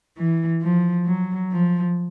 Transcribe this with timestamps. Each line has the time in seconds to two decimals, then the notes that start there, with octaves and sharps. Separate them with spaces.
0.17 E3
0.62 F3
1.06 F#3
1.51 F3